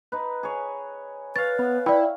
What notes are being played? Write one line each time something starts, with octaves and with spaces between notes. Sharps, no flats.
D#4 B4
G#4 C#5
B4 C#5 F5 A6
B3
E4 D5 G5